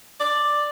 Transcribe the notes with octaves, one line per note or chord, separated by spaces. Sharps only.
D5